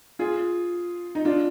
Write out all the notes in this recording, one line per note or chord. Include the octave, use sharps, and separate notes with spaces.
F4 G#4
D#4
D4 F4